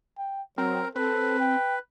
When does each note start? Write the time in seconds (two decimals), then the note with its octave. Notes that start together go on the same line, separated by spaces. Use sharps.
0.18 G5
0.58 F#3 C4 A#4
0.96 C4 A4 B4
1.40 G5